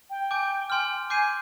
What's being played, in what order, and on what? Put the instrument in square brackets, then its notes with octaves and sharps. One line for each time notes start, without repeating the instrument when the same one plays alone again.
[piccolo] G5
[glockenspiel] G#5 D6 G6
G#5 C6 F6
[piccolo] G#5 [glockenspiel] D6 G6 C7 D#7